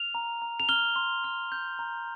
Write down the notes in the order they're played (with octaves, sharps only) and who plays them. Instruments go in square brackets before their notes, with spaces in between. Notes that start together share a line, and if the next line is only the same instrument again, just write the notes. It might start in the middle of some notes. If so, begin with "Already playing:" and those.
Already playing: [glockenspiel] F6 F7
A#5
A#5
F7
F6 G7
C6
F6
G6
A#5